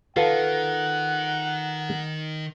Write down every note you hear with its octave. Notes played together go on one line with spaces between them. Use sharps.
D#3 F4 A4 B4 F#5